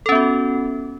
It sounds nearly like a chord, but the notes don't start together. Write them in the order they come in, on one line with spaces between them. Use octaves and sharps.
A4 C#4 B3 F#4